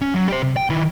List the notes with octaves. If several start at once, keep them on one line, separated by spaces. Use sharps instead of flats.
C#4
F#3
G4 C5
C3
G5
D#3 E4